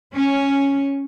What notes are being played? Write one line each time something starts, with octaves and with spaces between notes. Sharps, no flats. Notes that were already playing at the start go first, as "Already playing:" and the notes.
C#4